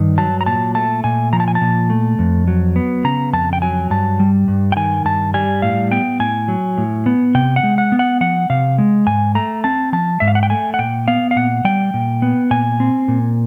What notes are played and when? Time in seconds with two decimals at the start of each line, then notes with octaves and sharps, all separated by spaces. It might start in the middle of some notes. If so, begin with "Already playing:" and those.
Already playing: G2 D#3
0.18 F#3 A5
0.41 A#5
0.46 A#2 A5
0.75 A3 A5
1.04 A#2 G#5
1.33 F3 A#5
1.40 A5
1.48 G#5
1.55 A5
1.61 A#2
1.90 A3
2.19 F2
2.48 F#3
2.76 B3
3.04 C#3 A#5
3.33 F2 A5
3.53 G5
3.62 F#3 G#5
3.90 G2 A5
4.20 G3
4.48 G2
4.72 G5
4.76 D#3 G#5
5.05 G2 A5
5.34 G3 G#5
5.62 A2 F5
5.91 B3 G5
6.20 A2 G#5
6.48 F#3
6.78 A2
7.06 B3
7.35 C3 G5
7.56 F#5
7.63 G#3
7.78 F#5
7.92 B3
7.99 F#5
8.21 F3 F#5
8.50 C3 F5
8.78 G#3
9.07 G#2 G#5
9.35 A3 A#5
9.64 C4 A5
9.93 F3 A5
10.20 G#2 E5
10.28 F5
10.35 F#5
10.43 G5
10.50 A3 G#5
10.74 F#5
10.79 A#2 G5
11.08 B3 F5
11.31 F5
11.36 A#2 F#5
11.65 G3 G5
11.94 A#2
12.22 B3
12.51 A#2 G#5
12.80 C4
13.08 A#2